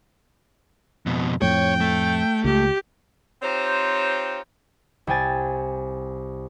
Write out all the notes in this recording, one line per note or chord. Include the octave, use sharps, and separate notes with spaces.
F2 B2
F2 A2 C#5 G5
A3
C#2 G4
C4 D#4 F4 G4 C5 C#5
C2 G5 G#5 A6